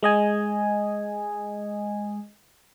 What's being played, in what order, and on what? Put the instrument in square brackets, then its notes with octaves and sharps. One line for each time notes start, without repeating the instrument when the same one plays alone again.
[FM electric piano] G#3 D#5 G#5